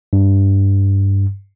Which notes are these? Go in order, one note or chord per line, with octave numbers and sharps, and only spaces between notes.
G2